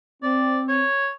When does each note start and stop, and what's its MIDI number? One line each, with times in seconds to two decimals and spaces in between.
0.23 0.84 60
0.23 0.61 74
0.68 1.10 73